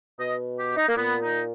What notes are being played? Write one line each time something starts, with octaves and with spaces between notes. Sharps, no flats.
B2 D#5
G4
D#4
A#3
A#2 B3
D#4